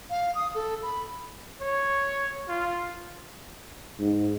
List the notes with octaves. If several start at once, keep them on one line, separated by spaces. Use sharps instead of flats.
F5
D#6
A4
B5
C#5
F4
G#2